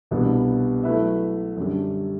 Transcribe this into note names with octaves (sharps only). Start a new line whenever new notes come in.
C2 B2 G3 B3 D4
F#3 A3 E4 B4 E5
F#2 D3 G3